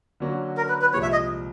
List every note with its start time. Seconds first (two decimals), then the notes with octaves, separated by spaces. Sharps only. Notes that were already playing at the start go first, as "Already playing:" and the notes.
0.20 D3 F#3 A#3 C#4 F#4
0.57 A#4
0.69 B4
0.81 B4
0.93 C2 A#2 F3 G#3 C#5
1.02 E5
1.12 D#5